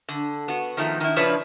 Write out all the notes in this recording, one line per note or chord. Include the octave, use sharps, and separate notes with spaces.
D3
B3 F#4
D#3 F3 A3 B3 D#4
D#3 E4
C#3 F3 D4 E4 B4 C#5